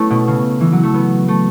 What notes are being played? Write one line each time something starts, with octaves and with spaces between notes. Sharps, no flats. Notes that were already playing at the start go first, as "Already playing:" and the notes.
Already playing: A3 B3 C#4 E4
B2
C#3
E3
F#3
A3
B3
A3